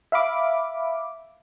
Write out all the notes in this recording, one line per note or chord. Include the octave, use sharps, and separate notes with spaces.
E5 F5 B5 D6